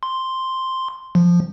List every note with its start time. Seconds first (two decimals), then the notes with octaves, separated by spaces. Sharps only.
0.03 C6
1.15 F3